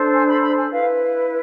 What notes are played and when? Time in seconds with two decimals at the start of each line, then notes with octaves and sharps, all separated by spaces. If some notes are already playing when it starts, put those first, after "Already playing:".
Already playing: D4 A4 C5
0.14 G#5
0.28 B5
0.42 B5
0.57 G#5
0.70 E4 B4 F5